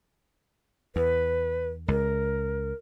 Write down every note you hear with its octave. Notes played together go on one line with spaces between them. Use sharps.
E2 B4
C#2 A#4